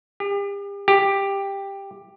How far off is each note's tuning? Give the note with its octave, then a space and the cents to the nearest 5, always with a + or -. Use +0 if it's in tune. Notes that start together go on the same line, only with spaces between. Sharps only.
G4 +40
G4 +10